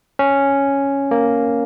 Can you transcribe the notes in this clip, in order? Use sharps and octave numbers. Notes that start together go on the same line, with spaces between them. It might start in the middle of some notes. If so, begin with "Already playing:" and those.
C#4
A#3